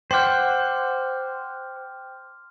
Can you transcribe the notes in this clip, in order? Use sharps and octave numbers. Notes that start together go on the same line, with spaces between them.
C5 F#5 G5 C6 D6 F6 G6